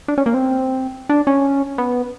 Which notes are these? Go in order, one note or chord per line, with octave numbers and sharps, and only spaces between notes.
D4
C#4
A#3
C4
D4
C#4
B3